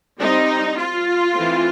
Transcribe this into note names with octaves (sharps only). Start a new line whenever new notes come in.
G3 C4 D#4
F4
E3 A3 C4